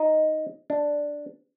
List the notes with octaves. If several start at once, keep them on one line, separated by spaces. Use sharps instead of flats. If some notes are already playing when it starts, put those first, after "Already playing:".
Already playing: D#4
D4